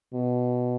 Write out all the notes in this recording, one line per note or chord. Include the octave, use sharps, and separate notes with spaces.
B2